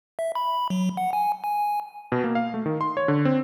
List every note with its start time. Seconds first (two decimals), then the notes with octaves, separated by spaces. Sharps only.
0.19 E5
0.35 B5
0.70 F#3
0.97 F#5
1.13 G#5
1.44 G#5
2.12 B2
2.24 A#3
2.35 F5
2.54 A3
2.66 D#3
2.81 C6
2.97 C#5
3.08 D3
3.25 C4